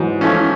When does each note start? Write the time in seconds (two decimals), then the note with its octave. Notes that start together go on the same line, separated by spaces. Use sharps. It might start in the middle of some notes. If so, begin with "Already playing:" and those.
Already playing: G#2 E3 F#3
0.21 F3 A3 C#4